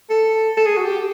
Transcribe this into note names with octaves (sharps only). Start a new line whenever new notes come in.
A4
A4
G#4
F#4
G4